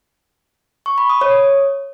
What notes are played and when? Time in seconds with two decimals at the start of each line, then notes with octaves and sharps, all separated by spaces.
0.86 C#6
0.98 B5
1.10 D#6
1.21 C#5